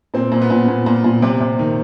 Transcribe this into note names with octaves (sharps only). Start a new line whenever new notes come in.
A#2 C4
A#2
B3
A#2
A#2
A#2
A#2
C3
C3
D#3